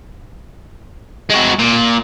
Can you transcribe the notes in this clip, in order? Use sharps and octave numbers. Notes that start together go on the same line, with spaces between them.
G#3 F#4
A#2